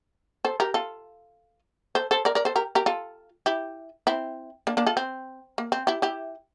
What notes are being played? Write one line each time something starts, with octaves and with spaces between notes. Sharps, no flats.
A4 C5
G4 A#4
F4 A4
A4 C5
A4 C5
A#4 D5
A#4 D5
A4 C5
G4 A#4
G4 A#4
F4 A4
E4 G4
C4 E4
A#3 D4
A#3 D4
F4 A4
C4
A#3
C4
E4 G4
E4 G4